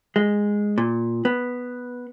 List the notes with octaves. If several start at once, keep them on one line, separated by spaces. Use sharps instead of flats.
G#3
A#2
B3